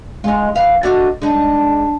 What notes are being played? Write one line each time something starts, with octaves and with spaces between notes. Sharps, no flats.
G#3 D#4 F4
E3 B4 F5
A3 D4 D#4 F#4
G#3 D4 D#4